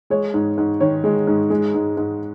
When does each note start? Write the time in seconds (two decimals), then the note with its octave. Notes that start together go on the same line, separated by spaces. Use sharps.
0.10 G#3 C#5
0.34 G#2
0.58 G#2
0.80 D#3 C#5
1.04 G#3
1.27 G#2
1.50 G#3
1.74 G#2
1.97 G#2